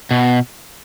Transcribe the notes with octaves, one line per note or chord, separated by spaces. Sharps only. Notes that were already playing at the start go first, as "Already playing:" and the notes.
B2